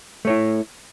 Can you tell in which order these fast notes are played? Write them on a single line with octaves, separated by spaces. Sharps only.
A3 C#5 E4